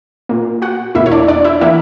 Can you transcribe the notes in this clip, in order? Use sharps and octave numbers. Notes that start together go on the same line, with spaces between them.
A#2 A#3
F#4 F#5
E2 B2 A#3 E4 E5
C#5
D4 D5
D4 D5
E4 E5
E3 A#3 E4 E5